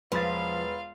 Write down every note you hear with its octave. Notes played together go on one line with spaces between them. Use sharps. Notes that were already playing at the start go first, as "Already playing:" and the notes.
E1 F3 F4 B4 F5 B5 A6